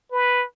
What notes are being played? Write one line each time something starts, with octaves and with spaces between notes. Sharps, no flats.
B4